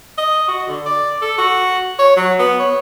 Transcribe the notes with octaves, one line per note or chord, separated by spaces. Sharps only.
D#5
F#4
D3
D5
A4
F#4
C#5
F#3
B3
C#5